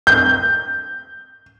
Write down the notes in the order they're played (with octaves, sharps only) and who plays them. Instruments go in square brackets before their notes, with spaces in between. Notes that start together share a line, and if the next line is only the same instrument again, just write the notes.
[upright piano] G6